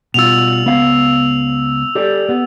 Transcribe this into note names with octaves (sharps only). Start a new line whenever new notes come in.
B2 G3 F4 E6 F7
C#2 B3 F5
G4 A4 D5
B3